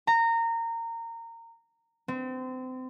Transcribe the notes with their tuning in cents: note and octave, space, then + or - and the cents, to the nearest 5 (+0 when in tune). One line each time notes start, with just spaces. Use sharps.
A#5 -20
C4 -30